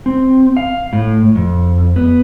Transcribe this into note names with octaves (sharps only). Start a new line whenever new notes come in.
C4
F5
A2
F2
B3